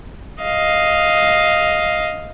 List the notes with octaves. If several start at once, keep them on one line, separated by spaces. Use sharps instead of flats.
D#5 F5